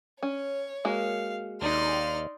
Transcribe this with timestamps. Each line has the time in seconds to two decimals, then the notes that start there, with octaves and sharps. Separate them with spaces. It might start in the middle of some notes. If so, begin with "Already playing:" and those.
0.23 C#4 C#5
0.85 G#3 A#3 F#4 F5
1.62 D#2 D#4 D5 C6 F6